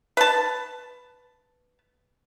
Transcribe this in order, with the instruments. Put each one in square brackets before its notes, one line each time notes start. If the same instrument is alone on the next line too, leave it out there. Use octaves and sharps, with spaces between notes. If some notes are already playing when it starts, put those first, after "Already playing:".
[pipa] B4 A5